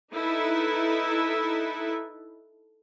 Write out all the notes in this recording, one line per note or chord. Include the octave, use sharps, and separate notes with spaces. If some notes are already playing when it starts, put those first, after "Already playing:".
D#4 E4 A4 B4 E5